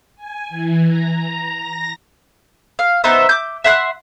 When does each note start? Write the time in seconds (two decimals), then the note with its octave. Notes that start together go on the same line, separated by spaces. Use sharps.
0.16 G#5
0.49 E3
0.86 A#5
1.16 A#5
1.54 A#6
2.79 F5
3.04 B3 D#4 C5 E5
3.29 D6 G6
3.64 E5 F#5 C6 F#6